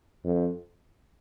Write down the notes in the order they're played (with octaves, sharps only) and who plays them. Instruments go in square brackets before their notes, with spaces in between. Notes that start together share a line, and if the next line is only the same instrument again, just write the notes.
[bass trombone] F2